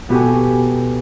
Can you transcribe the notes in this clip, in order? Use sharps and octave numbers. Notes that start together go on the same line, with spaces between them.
B2 B3 F#4 G4 A4 G#5